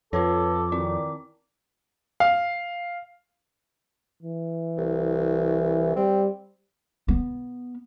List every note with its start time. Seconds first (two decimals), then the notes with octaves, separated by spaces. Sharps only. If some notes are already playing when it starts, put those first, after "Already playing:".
0.13 F2 F4 A4 B4 C#5 D6
0.72 D#3 C4 E4 D5
2.20 F5
4.23 E3
4.77 C2
5.96 G3 C4
7.08 B3